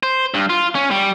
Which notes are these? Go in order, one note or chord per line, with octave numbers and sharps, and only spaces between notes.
C5
G2
F4
C#4
G3